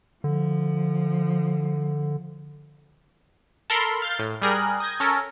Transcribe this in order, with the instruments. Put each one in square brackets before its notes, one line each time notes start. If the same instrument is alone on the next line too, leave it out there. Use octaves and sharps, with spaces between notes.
[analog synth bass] D3 [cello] F3
[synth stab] A4 A#4 B5 C6
F5 G6 A6
A2
G3 G#4 A#4 F#6
D#6 G6 G#6 A#6 D#7
C#4 A4 A#4